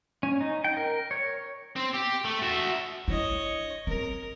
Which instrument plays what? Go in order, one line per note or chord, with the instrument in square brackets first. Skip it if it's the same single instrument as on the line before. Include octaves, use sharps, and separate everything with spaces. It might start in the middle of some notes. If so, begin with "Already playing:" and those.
[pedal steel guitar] C#4
D#4
G5
A#4
C#5
[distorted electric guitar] C4
G4
A3
F#4 E5
[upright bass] D4 E4 [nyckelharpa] C#5 D#5
[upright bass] C4 [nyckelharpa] A#4